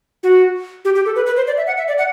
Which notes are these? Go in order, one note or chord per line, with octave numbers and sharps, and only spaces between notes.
F#4
G4
G4
A4
B4
B4
C5
D5
E5
F#5
E5
D5
F#5